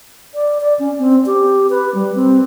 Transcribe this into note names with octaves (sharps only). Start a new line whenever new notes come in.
D5
D5
C#4
C4
G4
B4
G3
C4